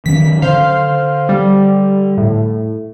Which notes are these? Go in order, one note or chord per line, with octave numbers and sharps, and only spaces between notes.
D#3 F#3 C#4 B6
D3 C5 F5
G3
A2